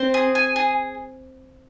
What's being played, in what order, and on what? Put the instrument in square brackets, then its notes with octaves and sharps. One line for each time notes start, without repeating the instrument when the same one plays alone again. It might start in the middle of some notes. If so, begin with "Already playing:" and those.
Already playing: [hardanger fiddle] C4 [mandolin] C5
[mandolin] G#4
G#5
G#4